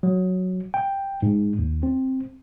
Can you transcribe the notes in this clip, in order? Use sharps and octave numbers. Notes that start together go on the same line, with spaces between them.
F#3
G5
G#2
D#2
C4